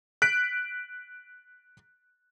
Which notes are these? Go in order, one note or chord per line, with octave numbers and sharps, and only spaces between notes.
F#6 B6 D7